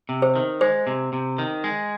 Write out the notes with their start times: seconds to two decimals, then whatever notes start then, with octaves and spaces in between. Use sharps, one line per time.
0.09 C3
0.22 C5
0.36 D#3
0.61 G#3 C5
0.87 C3
1.13 C3
1.38 D#3
1.64 G#3